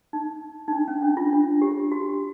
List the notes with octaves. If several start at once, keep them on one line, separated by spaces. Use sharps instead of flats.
D#4
D#4
D4
C#4
D4
F4
D4
G4
F#4